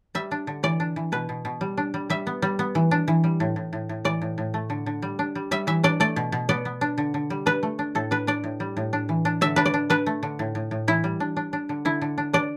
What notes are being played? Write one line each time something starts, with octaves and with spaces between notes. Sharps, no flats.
G3 E5
D4
D3
E3 D5
D4
E3
B2 B4
B2
B2
G3
D4
G3
G3 E5
B3
G3
B3
E3
D4
E3
G3
A2
A2
A2
A2
E3 D5
A2
A2
A3
D3
D3
G3
D4
G3
G3 E5
E3 E5
D4 D5
A3 D5
B2
B2
B3 D5
B3
D4
D3
D3
G3
D4 B4
A3
D4
A2 A4
D4 B4
D4 D5
A2
G3
A2
D4
E3
D4
D3 E5
D4 B4
D5
D4
D4 B4
A3
D3
A2
A2
A2
E3 E4
G3
D4
D4
D4
D3
D3 E4
D3
D4
D4 D5